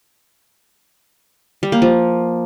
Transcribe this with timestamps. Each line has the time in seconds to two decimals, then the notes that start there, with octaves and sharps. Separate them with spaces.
1.63 G3
1.72 A#3
1.82 F3